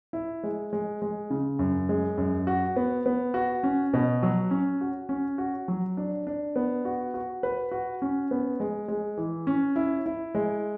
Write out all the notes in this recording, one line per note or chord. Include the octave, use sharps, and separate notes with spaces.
E4
G#3
G#3
G#3
C#3
F#2
G#3
F#2
F#4
B3
B3
F#4
C#4
B2
F#3
C#4
F#4
C#4
F#4
F#3
D4
D4
B3
F#4
F#4
B4
F#4
C#4
B3
G#3
G#3
E3
C#4
E4
E4
G#3